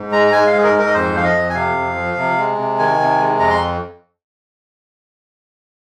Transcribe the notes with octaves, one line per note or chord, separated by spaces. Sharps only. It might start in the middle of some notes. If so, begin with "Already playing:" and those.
Already playing: G#2
G#3 A#5
A#5
G#3 G#5
F5
G#2
G#4
A#4
G#2
A#4
D#5
F2 C5
F3 F5
D#5
F2
G#5
C3 F5
F2
F3
C3
G#3
C3
D#3 G#5
C3
G#3
F2 A#5
C6